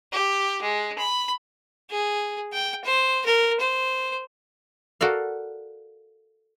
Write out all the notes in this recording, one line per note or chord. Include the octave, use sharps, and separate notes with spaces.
G4
G#3
B5
G#4
G5
C5
A#4
C5
F#4 A4 A#4 D5 F5